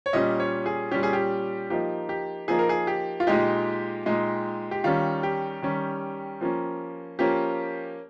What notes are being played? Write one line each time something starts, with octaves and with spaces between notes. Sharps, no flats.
C#5
A#2 G3 C#4 D#5
C#5
G#4
A#2 G3 C#4 G4
G#4
G4
F3 A#3 D#4 G4
G4
F3 A#3 D#4 G#4
A#4
G#4
G4
F4
A#2 G#3 D#4 G4
A#2 G#3 D#4
G4
D#3 G3 C#4 F4
G4
D#3 G3 C#4
F3 A#3 C#4
F3 A#3 C#4 G4